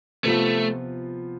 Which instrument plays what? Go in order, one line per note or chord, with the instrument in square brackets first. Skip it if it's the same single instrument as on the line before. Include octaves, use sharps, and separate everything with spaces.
[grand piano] C3 F3 B3 F4 [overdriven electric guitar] A3